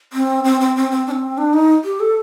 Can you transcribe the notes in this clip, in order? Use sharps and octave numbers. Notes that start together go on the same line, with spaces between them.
C4
C4
C4
C4
C4
D4
C4
D4
D#4
G4
A4